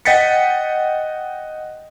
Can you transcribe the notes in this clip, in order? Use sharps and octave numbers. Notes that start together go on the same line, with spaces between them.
D#5 F#5 G5 A6 B6 C#7